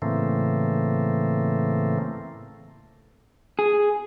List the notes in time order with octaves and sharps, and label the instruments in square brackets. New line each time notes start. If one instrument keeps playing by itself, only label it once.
[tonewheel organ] A2 C#3 E3 A3 A#3 C4
[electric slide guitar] G#4